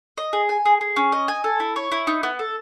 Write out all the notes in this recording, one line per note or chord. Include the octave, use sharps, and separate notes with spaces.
D#5
G#4
G#5
G#4
G#4
C#4
D#5
G#5
A4
E4
C#5
E4
D#4
B3
A4